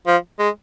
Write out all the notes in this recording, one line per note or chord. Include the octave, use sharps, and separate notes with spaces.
F3
G#3